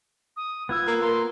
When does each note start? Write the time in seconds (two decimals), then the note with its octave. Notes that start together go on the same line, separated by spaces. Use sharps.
0.37 D#6
0.69 B3 F4 E6 G#6
0.87 A#3
1.01 A#3 C6